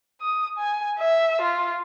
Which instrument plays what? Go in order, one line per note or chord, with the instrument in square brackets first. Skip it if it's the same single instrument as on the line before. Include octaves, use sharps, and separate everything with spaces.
[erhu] D#6
G#5
E5
F4